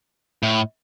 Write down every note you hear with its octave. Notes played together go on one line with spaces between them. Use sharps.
A2